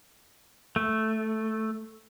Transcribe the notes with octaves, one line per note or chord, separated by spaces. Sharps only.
A3